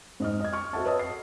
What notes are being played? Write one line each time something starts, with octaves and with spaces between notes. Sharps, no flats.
G#2 D#5 F6
D#5 G#6
C#6 F6
C4 F#4 A4 E5 F#5 A5
B4 C#5 D#5 A5 D#6 E6
C7